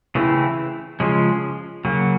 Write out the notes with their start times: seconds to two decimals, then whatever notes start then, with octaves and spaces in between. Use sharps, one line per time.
0.15 C#3 E3 A3 C4 E4
1.00 C#3 F3 G#3 C#4
1.85 C#3 F#3 A#3